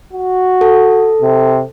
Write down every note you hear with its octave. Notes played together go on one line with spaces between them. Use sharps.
F#4
A4
C3